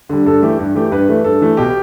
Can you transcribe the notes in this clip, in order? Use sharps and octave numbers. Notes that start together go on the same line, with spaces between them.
D3 G3
G2 A4
E3 A3 G4
G2
E3 A3 G4
G2 B4
E3 A3
G2 A4
E3 A3
B2 G4